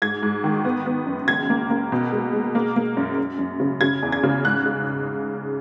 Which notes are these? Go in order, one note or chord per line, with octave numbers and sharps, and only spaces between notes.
G#2 G#6
G#2
D#3
B3
B3
F#2
C#2 G#6
A#3
A#3
B2
G#3
G#3
A#3
A#3
F#2
F#2
F#2
C#3
C#3 G#6
E2
G#6
C#3
G#2 F#6
G#3